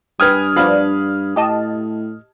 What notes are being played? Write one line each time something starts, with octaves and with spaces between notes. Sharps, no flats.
G2 B4 G5 G#5 D#6 F6 G#6
F3 B3 D4 F5 B5
A2 G4 D#5 A5